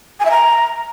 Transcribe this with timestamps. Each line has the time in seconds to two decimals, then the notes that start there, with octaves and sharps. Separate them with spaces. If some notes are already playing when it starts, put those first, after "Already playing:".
0.20 G#5
0.25 E5
0.31 A#5